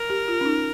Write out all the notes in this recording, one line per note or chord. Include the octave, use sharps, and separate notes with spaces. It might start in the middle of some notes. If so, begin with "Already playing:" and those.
Already playing: A#4
G4
F4
C#4
D#4